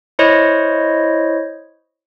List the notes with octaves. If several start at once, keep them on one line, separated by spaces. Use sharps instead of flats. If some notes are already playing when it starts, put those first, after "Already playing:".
E4 C5 C#5 D#5